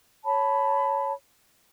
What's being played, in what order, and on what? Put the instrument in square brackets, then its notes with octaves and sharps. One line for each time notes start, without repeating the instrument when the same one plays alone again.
[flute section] C#5 A5 B5